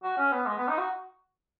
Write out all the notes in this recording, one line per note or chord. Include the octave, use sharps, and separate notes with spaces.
F#4
C#4
B3
G#3
B3
D#4
F#4